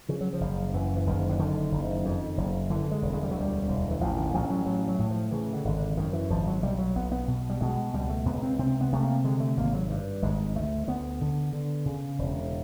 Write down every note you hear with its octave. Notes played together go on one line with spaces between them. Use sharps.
C#3 F3
F#3
F3
F#1
F#2 E3
E3
F#1 D#3
D3
D3 D#3
F#1
F2
F#1
D3 E3
G#3
E1
G#3
G3
F#3
D2
G3
E1
E3
A1 F3
D#3
A1 F3
F#3
A2 F#3
F#3
A2
F3
C#3 E3
D3
G#1
D3
F#2 D#3
E3
G#1 F3
F#3
B1 G3
F#3
B1 B3
B3
B2
G3
B2 G#3
C#2 G3
A3
C#2 B3
C4
C3 C4
B3
C3 A3
A#3
D3 G#3
A3
G#1 A#3
F#3
G2
G#1 G#3
D2 A3
D2 B3
D3
D3
C#3
E1